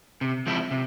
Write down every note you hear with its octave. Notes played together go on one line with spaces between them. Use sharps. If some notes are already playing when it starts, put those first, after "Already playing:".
C3
F3 G#3 C4 E4
C3